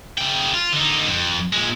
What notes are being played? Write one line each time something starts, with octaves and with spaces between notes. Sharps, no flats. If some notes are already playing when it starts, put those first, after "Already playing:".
C#3 G5
F4
D3 D#4
F2
A#2 G#3